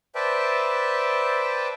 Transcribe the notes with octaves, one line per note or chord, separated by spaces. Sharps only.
B4 C5 D5 E5 G5 A5